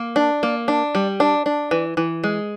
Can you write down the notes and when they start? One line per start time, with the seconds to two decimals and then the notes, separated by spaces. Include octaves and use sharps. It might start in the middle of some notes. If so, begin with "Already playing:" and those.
Already playing: A#3
0.16 D4
0.43 A#3
0.68 D4
0.95 G3
1.20 D4
1.46 D4
1.71 E3
1.97 E3
2.24 G#3